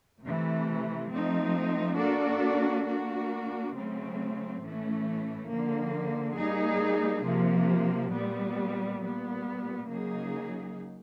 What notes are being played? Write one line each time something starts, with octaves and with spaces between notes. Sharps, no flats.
C3 E3 A3
F3 A3 C4 D#4
A#3 D4 F#4 A4 D5
A#3 D4 F#4
C#3 F#3 A3 C4
A2 E3 A3 C#4
D3 F3 A#3
G3 A#3 D#4 G#4
C3 F3 A#3
A#2 G3 B3
A#2 G3 B3
C#3 F#3 A#3 D#4 G#4